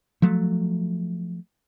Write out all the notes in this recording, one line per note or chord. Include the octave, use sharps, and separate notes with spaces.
F3 F#3 A3